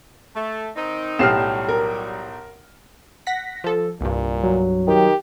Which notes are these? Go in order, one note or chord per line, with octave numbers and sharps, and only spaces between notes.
A3
D#3 C4 D#4
B1 A2 G4 F6 C7 E7
F#3 G3
A#4
F#5 A#6 B6
F3 A4
C2 G2 A#2
F#3
D#3 G4